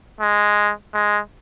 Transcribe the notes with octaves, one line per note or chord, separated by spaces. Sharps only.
G#3
G#3